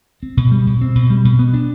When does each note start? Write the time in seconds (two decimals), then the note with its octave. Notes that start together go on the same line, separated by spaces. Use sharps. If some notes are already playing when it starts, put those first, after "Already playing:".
0.23 C4
0.37 B2
0.52 G3
0.67 B2
0.81 C4
0.95 B2
1.10 G3
1.25 B2
1.39 B3
1.54 D4